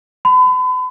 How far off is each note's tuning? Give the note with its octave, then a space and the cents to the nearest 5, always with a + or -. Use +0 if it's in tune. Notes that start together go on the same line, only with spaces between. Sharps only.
B5 +40